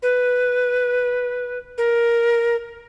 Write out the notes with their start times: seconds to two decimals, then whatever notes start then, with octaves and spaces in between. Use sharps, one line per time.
0.03 B4
1.78 A#4